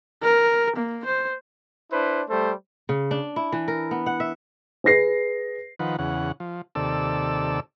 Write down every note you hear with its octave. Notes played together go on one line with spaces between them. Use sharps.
A#4
A#3
C5
D4 E4 B4 C5
G3 A3 A4 C5
C#3
D4
E4
E3
A#4
B3
F#5
E5
G#4 B4 A#6 C7
D#3 F3 B4 F#5
E2 C#3 F#5
F3
D#2 C3 A4 D5 E6